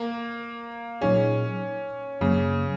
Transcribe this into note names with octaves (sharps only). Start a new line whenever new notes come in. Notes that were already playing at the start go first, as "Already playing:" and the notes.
Already playing: A#3
A#2 F#3 C#4 D#4 G#4
F#2 C#3 F#3 A#3